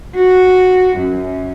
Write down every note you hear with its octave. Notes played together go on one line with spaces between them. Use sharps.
F#4
F#2